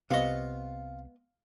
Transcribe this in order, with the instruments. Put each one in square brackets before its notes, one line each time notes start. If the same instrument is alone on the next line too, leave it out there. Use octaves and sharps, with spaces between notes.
[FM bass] C2 [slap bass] C3 [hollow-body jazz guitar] B3 D#5 [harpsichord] F4 C#6